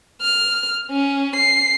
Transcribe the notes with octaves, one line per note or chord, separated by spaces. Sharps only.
F6
C#4
C7